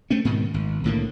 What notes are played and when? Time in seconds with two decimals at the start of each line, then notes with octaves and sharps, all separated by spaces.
0.10 A3 C4 C#4
0.25 G#2 B2 D#3
0.54 G#1
0.84 C2 A2 D3 A#3